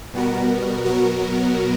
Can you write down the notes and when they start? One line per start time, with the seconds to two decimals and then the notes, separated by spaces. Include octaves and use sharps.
0.14 B2 G3 B3 F#4 A#4
0.85 B2 F#3 B3 F#4 A#4